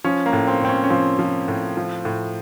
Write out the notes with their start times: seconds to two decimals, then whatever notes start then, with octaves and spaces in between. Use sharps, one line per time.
0.04 F3 C#4
0.26 A#3
0.33 A2
0.47 C4
0.61 A2 C4
0.69 C#4
0.84 C#4
0.90 F3 C4
1.19 F3
1.48 A2
1.77 F3
2.05 A2